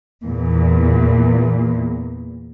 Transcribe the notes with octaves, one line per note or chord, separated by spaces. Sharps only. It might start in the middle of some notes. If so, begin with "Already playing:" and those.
E2 A#2